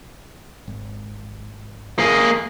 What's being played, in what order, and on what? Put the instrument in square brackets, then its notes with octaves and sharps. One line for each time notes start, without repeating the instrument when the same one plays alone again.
[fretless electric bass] G#1
[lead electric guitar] A#3 G#4